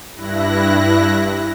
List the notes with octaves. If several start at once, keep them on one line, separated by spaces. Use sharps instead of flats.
G2 E4 F#6 A#6